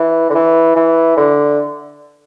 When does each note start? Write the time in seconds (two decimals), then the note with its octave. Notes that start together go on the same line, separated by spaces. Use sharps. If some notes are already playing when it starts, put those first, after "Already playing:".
Already playing: E3
0.30 D3
0.35 E3
0.76 E3
1.17 D3